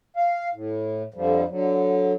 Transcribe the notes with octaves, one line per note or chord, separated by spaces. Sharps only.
F5
A2
F2 D3 F3 G3
D3 F#3